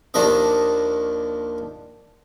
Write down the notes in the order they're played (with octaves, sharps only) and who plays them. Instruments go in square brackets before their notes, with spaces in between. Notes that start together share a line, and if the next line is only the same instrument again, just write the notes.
[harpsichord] D#2 D#3 F3 D4 D#5